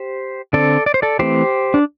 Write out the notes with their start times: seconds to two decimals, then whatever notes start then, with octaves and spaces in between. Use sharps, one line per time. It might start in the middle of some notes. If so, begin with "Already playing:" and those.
Already playing: G4 C5
0.53 D3 C4 A4 D5
0.86 D5
0.94 C5
1.02 A4 D5
1.19 E3 A3 C4 G4 C5
1.74 D4